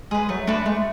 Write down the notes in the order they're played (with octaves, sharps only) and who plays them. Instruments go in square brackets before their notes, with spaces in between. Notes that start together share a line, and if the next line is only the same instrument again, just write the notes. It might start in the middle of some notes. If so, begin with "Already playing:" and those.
[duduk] G#3 [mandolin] G#4
[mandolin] B4
[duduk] F#3 [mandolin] A3
[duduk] A3 [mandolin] D4 F#4 B4
[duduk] G#3 [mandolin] A3